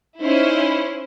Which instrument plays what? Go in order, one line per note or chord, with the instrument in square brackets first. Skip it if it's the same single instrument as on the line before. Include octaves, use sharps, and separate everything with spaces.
[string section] C#4 E4 C5 [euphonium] D#4